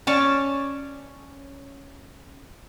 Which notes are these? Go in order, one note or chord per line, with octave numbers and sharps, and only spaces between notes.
C#4 D5 A5 C#6